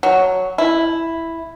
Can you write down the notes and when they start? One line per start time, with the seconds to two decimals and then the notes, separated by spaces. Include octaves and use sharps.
0.03 F#3
0.58 E4